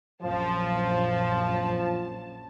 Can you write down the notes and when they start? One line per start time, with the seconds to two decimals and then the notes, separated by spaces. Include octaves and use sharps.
0.22 A#1 F#2 F3 A5